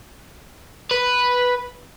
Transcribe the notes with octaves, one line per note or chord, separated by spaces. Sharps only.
B4